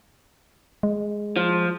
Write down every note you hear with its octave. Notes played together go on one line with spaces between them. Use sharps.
G#3
F3